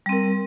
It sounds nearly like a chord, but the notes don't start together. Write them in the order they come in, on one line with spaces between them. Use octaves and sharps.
G3 C4 A#4